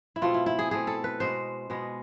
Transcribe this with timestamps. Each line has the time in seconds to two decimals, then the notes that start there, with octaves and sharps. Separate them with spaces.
0.16 E4
0.22 B2 A3 C4 F4
0.34 E4
0.46 E4
0.59 G#4
0.71 B2 A3 C4 G#4
0.87 A4
1.04 B4
1.20 B2 G#3 B3 C5
1.70 B2 G#3 B3